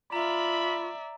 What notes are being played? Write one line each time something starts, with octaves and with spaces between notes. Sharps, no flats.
F4 D5 E5 A#5 B5